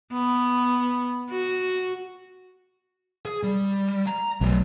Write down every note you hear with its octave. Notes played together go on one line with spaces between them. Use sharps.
B3
F#4
G#4
G3
A#5
B1 F#3 A3